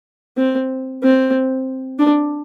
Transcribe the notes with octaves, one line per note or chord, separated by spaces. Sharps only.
C4
C4
D4